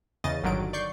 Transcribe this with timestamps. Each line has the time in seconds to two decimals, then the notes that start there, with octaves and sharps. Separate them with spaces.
0.24 E2 C#3 D#5 A6
0.42 G1 D3 D#3 F#3 D7
0.73 D5 C#6 G6 C7